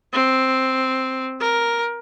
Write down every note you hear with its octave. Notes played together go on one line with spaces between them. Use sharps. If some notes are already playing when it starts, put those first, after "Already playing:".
C4
A#4